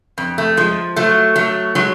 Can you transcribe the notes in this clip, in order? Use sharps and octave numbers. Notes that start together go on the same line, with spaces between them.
F2
A3
F3 G#3
F#3 A3
F#3 A3
F#3 G#3